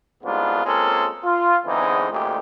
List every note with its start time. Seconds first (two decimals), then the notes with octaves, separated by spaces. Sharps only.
0.23 C2 G#2 G#3 B3 D4 F4
0.65 G#3 A#3 C4 C#4 F4 A4
1.24 F4
1.65 E2 G#2 D3 E3 C4 D#4
2.11 A1 D2 A#2 G#3 A3 G4